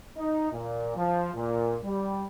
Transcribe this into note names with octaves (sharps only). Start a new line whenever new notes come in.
D#4
A#2
F3
A#2
G3